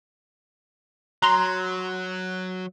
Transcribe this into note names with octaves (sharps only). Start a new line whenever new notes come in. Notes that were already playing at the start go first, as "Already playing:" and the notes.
F#3 A#5 C6